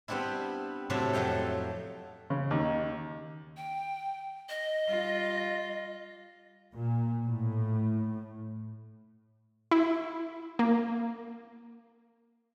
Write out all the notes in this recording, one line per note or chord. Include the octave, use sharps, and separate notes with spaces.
G3 B3 C4 D4 E4
A2 C3 F#3 A3 A4 E5
F2 F#3 A3 F5 G5
C#3
D#2
G5
D#5
G3 F4
A#2
A2
E4
A#3